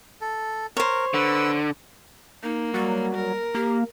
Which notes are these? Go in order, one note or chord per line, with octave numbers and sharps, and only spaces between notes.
A4
A#4 C5 C#5
D3 B4 E6
A#3 D#4
F#3 G3
A#4
A#3 G4